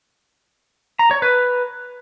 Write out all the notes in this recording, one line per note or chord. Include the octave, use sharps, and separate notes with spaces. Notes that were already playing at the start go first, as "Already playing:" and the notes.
A#5
C#5
B4